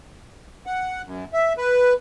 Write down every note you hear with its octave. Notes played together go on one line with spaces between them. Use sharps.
F#5
F#2
E5
B4